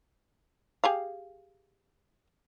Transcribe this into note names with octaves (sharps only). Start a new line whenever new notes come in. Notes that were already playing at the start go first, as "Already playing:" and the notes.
G4 G#4 F5